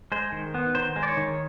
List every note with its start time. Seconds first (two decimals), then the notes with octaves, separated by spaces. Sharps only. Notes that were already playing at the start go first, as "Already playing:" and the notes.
0.12 G#3 C5
0.32 D#3
0.54 B3
0.75 D#3 C5
0.96 G#3
1.03 D5
1.07 C#5
1.17 D#3